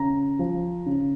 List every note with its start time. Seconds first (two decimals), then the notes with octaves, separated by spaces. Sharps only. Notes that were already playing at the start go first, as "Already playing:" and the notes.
Already playing: C#3 A#5
0.39 F3
0.86 C#3